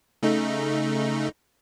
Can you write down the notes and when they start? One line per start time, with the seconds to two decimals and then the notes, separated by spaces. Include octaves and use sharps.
0.23 C#3 A3 D#4